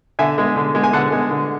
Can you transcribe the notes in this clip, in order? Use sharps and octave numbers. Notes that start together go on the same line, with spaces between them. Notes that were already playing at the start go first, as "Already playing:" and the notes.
D3 E5 G#5
G#3
D3
G#3
G#5
D3 F#5 A5
G#3
D3